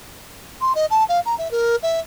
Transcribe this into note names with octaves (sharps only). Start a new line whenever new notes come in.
C6
D#5
A5
F5
A#5
E5
A#4
E5